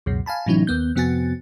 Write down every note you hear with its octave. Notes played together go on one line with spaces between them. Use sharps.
C#2 F#2 B2
F5 G#5 A5 B5
A2 C3 E3 F#3 C#4 D#4
D#2 B3 G6
F2 C3 B3 F#4 G#5 A6